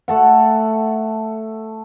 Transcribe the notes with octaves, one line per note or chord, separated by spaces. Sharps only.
A3 A4 F#5